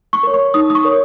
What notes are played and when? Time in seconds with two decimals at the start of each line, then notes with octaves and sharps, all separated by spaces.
0.13 C#6
0.23 A#4 C#5
0.34 C#6
0.54 D#4 D#6
0.70 D#6
0.75 C#6
0.85 A#4 C#5